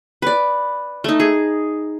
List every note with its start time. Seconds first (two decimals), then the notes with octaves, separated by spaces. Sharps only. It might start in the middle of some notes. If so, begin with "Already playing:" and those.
0.22 B4 D5
1.04 A3 D#4
1.20 G#4